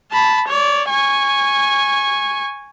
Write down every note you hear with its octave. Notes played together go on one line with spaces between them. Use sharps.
A5 B5
C#5 D5
G#5 C#6